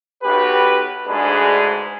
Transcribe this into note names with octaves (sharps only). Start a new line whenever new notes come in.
B1 F#4 G4 B4
D2 G#2 G#3 D4 G#4 B4